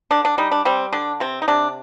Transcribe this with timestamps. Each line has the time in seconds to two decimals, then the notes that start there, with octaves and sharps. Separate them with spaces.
0.11 D3 D4
0.25 D4
0.38 G3 D#4
0.51 D4
0.65 G3 C4
0.93 D3 D4
1.20 C3 C4
1.42 D#4
1.48 C3 D4